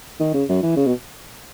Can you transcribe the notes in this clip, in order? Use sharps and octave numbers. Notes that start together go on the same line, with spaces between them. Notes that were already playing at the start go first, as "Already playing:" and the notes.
D#3
C#3
F#2
E3
C#3
B2